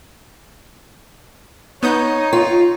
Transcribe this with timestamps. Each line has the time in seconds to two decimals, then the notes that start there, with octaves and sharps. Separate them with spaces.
1.83 B3 D#4 C#5 D#6 G6
2.33 F4